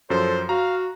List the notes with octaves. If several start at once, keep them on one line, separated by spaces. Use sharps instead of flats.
F#2 F3 A4 C5
F#4 F5 A#5